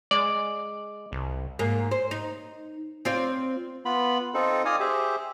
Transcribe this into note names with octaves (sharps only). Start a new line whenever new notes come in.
G#3 D5
C2
G#2 A#3
C5
D#4
C4 F4 D5
B3 F4 B5
C4 D#4 F4 A4
D5 D#5 F5 G#5 D#6 F6
G4 G#4 C5 E5